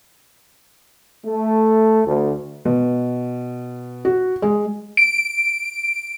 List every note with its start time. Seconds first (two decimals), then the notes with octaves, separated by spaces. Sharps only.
1.25 A3
2.06 D2
2.65 B2
4.05 F#4
4.42 G#3
4.97 D7